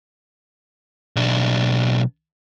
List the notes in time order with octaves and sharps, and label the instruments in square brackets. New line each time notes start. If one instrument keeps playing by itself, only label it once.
[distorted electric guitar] B1 D4